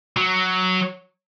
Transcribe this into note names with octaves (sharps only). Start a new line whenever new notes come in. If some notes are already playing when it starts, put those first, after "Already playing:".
F#3